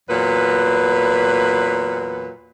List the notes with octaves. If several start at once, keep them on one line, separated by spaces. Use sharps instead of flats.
E2 A#2 F#3 B4